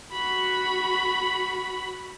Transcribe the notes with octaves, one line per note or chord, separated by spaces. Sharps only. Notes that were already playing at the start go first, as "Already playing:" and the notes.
F#4 B5